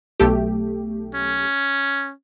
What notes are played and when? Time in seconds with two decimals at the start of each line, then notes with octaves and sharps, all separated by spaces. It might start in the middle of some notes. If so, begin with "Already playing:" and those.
0.20 B1 A3 G4
1.15 C#4